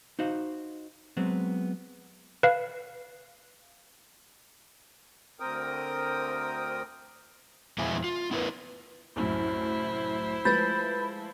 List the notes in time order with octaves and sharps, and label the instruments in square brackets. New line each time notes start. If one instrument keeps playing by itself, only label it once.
[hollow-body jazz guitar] D#4 F#4 C5 F5
F#3 G#3 B3 C4
[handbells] B4 F5
[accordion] D2 C4 A#4 G5 D#6
[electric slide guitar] F2 B2 G#3 E4 G#5
F4
B3 E4 A#4 B4
[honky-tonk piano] C2 F#2 A2 [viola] E4 C5
[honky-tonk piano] F3 G#3 A3 [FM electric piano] B4 B5 [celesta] G6 A6